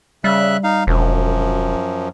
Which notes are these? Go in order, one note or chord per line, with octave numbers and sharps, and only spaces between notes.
C#3 G3 E5 F#6
D#4 F5
E1 F#2 F3